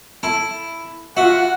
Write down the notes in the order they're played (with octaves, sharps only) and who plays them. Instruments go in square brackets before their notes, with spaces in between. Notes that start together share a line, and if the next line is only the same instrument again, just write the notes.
[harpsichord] E4 [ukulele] A4
[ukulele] F4 E5 [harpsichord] F#4 [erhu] F#5